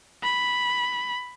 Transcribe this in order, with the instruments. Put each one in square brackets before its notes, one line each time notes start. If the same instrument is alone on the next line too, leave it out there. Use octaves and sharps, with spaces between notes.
[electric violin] B5